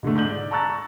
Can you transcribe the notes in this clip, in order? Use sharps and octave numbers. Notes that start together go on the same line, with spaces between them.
B2 D3 G#3 A3
G#2 D4 G6 F#7
D5
A5 A#5 C#6 E6 F#6 A6
C#6